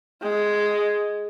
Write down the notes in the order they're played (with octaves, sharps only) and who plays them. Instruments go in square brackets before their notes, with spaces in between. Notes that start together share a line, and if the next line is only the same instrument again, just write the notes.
[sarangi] G#3